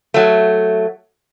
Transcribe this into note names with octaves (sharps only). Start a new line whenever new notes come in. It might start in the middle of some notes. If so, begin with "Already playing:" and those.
F#3 A3